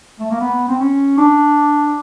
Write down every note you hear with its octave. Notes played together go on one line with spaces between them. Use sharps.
A3
A#3
B3
C4
C#4
D4